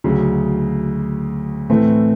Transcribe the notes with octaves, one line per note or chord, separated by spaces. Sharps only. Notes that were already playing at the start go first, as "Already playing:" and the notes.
D2 C#3 F#3
A2 E3 A3 C4